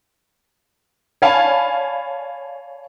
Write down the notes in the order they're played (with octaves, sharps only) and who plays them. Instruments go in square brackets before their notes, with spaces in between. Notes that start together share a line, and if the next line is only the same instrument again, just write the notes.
[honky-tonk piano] C#5 D5 F5 G#5 A5 B5